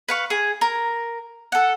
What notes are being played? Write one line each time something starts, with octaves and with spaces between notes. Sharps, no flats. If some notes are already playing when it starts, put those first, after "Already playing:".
B4 F5 C#6
G#4
A#4
A4 F#5